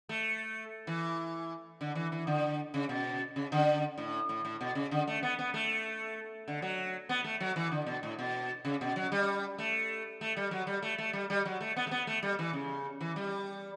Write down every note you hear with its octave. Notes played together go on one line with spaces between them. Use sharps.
A3
E3
D3
E3
E3
D3
C#3
B2
C#3
D3
A2
A2
A2
B2
C#3
D3
A3
B3
B3
A3
D3
F#3
B3
A3
F#3
E3
D3
B2
A2
B2
C#3
B2
F#3
G3
A3
A3
G3
F#3
G3
A3
A3
G3
G3
F#3
A3
B3
A3
B3
A3
G3
E3
C#3
E3
G3